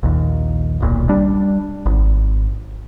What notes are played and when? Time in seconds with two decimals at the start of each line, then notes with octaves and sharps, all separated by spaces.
0.03 A#1 D#2
0.80 D#1 B1 A#2
1.09 G3 D4
1.86 G#1